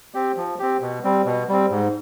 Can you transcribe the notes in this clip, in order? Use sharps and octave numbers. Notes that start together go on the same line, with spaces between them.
C4 G4
F3
C4 G4
B2
G3 C4
B2
G3 C4
G#2